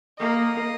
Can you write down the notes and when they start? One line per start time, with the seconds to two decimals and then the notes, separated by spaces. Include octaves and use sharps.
0.19 A#3 D#5